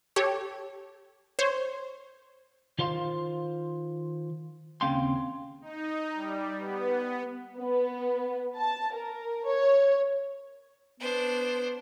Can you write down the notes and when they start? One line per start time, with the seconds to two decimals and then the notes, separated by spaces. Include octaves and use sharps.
0.16 G4 A4 C#5
1.39 C5 C#5
2.79 D#3 F4 C5 F5 C6
4.81 D#2 C#3 C4 F5 G5 C6
5.62 D#4
6.15 G3
6.59 B3
7.58 B3
8.57 A5
8.95 A#4
9.46 C#5
11.00 B3 D4 C5